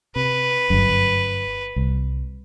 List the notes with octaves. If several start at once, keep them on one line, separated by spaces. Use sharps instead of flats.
C3 B4
G1 F#2
C2